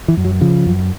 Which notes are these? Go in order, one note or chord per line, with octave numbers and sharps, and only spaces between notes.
E3
F#2
F#3
C#3 F3
F#2